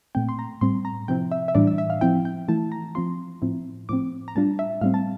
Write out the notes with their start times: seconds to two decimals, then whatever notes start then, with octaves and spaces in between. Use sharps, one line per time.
0.15 A#2 A3 C4 G5
0.29 C6
0.39 A#5
0.61 A2 G3 C4 C6
0.85 A#5
1.08 C3 F3 C4 E4 G5
1.32 E5
1.48 E5
1.55 A2 E3 G3 D4 D5
1.67 E5
1.78 E5
1.90 F5
2.01 F3 C4 E4 G5
2.25 G5
2.48 E3 A3 E4 A5
2.72 A#5
2.95 F3 C4 F4 C6
3.42 A2 F3 C4 E4
3.89 A2 F3 C4 D6
4.28 A#5
4.35 A2 G3 D4 F4 A5
4.59 E5
4.81 A2 G3 C4 F5
4.94 A5